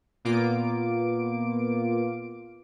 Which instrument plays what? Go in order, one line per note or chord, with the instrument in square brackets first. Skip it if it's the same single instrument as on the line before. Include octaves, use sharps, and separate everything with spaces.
[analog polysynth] A#2 A#3 B3 F4 D6 D7